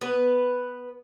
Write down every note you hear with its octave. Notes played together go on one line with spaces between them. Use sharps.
B3 B4